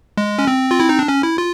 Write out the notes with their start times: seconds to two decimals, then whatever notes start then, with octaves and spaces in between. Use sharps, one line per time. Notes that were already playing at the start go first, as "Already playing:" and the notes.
0.17 G#3
0.39 C#4
0.48 C4
0.71 F4
0.80 E4
0.89 D#4
0.99 D4
1.08 C#4
1.23 E4
1.38 F4